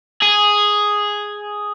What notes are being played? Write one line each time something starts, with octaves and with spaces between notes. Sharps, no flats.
G#4